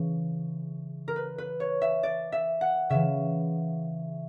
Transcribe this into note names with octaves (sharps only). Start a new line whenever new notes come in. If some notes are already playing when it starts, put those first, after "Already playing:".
Already playing: C#3 E3
A#4
B4
B4
C#5
E5
D5
E5
F#5
C#3 E3 E5